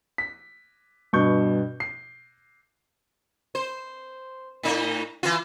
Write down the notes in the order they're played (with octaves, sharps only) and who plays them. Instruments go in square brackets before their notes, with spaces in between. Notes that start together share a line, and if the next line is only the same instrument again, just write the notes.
[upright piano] B6
G2 B2 C#6 G6
C7
[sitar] C5
A2 D#4
E3 F4